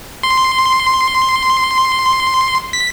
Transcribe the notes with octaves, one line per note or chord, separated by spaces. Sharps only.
C6
B6